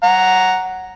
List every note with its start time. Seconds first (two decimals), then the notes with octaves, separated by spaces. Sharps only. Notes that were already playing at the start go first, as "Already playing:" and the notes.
0.03 F#5 A#5